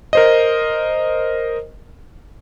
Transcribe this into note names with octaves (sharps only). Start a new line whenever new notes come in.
A#4 C5 D#5